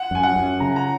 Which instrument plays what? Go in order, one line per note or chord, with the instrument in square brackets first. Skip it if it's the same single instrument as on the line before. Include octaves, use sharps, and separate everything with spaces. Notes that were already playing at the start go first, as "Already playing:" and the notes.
Already playing: [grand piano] F#5
[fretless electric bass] F#2 [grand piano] G#5
[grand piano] F#5
[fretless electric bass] F#2
[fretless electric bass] C#3 [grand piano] A#5
[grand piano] A#5